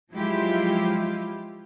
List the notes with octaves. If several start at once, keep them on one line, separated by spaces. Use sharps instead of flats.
F3 F#3 G#3 E4 F4 G4